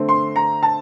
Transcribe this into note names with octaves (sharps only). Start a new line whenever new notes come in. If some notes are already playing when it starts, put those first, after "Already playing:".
Already playing: D3 A3 C4
C6
A#5
A5